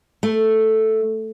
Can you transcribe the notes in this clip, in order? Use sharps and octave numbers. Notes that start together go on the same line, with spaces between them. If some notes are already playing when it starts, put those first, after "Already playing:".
A3